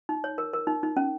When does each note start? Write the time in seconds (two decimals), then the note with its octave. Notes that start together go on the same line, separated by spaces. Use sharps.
0.09 D#4
0.24 C#5
0.38 A#4
0.53 A#4
0.67 D#4
0.83 D#4
0.97 C#4